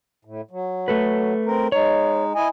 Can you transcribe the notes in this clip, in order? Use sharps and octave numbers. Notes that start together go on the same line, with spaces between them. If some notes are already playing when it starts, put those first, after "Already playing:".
A2
F#3
A3 A4 B4
C4 A#4
G#3 D#4 C#5
E4 D#5 G#5